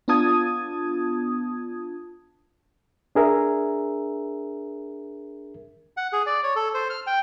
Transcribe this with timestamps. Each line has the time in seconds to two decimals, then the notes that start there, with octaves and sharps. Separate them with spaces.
0.08 B3 D4 F4 A5 D#6 G#6
3.15 D4 G#4 A#4 E5
5.97 F#5
6.13 G#4
6.27 D5
6.43 C#5
6.56 A4
6.74 C5
6.90 F6
7.07 G5